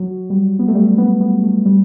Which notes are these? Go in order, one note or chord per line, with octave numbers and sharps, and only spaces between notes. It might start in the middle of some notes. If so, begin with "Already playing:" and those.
Already playing: F#3
G3
B3
A3
G3
B3
B3
A3
G3